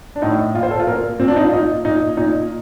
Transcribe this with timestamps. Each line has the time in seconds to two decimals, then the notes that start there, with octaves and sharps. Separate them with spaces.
0.16 D4
0.22 A2 D#4
0.54 A#2 F4
0.63 C5
0.71 A4
0.80 F4
0.87 A#2 A#4
1.19 A#2 C4
1.28 D4
1.36 D#4
1.44 F4
1.52 A#2 D#4
1.85 A#2 D#4
2.17 A#2 D#4